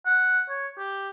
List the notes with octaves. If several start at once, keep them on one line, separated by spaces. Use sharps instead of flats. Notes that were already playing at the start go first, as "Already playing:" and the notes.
F#5
C#5
G4